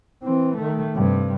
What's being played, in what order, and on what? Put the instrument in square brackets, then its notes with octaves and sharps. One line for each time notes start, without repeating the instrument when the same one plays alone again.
[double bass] E3 C4
D#3 A3
G2 C3